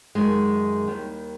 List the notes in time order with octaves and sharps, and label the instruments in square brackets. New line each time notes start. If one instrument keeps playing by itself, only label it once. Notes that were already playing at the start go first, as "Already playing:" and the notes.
[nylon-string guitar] F#2 D#3 G#3
D#2 D#3 G3